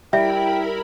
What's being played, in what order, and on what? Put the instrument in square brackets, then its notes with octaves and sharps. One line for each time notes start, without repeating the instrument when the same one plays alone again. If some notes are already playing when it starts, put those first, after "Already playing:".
[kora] G3 [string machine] E4 A#4 B5 [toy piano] E5 [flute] G5